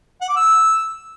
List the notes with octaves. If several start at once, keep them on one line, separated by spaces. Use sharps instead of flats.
F#5
D6
E6